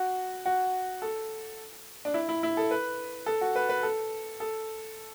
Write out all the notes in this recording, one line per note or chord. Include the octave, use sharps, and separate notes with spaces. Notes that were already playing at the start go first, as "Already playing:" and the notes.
Already playing: F#4
F#4
A4
D4
E4
E4
E4
A4
B4
A4
F#4
B4
B4
A4
A4